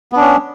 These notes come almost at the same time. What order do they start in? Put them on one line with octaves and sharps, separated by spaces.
B3 D4 C#4